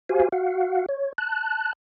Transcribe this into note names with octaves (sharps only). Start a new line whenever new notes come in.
F#4 G4 C5 F5 G#5
F#4 F5 F#5
C#5
A5 F#6